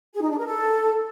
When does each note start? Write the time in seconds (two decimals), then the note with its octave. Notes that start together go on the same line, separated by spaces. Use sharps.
0.13 G#4
0.21 D#4
0.30 D4
0.38 A#4
0.46 A4